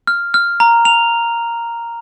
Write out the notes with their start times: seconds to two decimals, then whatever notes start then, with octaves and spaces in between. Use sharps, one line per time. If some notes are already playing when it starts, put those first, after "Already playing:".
0.07 F6
0.34 F6
0.60 A#5
0.85 F7